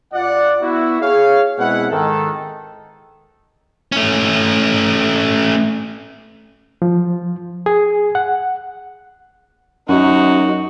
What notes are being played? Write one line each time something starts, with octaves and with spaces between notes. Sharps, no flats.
G2 F4 D5 F#5
B3 E4 F#4
G#4 C#5 F5
B2 G#3 C4 E4 F#5
G#2 D#3 A4
A3 C#4
F3
G#4
F#5
F#2 D#4 F#4